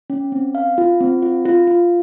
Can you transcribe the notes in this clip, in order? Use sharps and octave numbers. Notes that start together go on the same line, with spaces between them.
C#4
C4
F5
F4
C4
F4
F4
F4